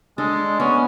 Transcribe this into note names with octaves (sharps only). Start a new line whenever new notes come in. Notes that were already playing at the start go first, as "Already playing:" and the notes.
G#3 D4 A4
B3 C#4